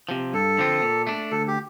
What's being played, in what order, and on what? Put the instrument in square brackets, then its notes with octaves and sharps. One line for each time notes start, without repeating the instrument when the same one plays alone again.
[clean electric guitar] C3 F3
[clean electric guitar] G2 [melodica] A4
[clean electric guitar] D3 F3 C4 F4
A#2
A3 D4
[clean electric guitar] D2 [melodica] A4
[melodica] G4